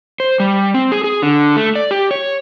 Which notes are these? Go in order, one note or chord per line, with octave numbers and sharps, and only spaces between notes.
C5
G3
C4
G#4
G#4
D3
A3
D5
G4
C#5